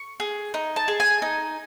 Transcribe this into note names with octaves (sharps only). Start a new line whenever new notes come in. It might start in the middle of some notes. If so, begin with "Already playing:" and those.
Already playing: C#6
G#4
D#4
A5
G#4
G#5
D#4